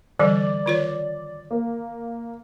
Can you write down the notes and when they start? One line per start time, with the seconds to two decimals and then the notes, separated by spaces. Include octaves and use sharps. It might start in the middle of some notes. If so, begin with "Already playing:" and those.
0.19 D3 E3 G3 D5
0.66 D#3 F4 C#5
1.51 A#3